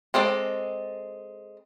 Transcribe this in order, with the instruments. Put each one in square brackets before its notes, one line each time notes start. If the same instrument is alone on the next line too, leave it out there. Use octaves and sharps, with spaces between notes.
[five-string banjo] G#3 C4 A4 D5